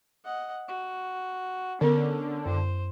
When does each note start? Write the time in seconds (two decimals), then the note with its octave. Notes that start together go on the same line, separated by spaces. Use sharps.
0.25 D#5 F#5
0.68 F#4
1.81 D3 B3 C#4 A#4
2.46 F#2 C5